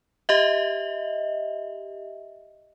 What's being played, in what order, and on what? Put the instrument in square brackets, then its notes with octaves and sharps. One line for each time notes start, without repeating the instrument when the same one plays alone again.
[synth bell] G4 D#5 E5